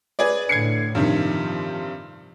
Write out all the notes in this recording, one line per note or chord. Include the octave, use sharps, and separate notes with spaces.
G#4 B4 D5
A2 D3 G#6 C7 C#7
G2 C3 D#3 F3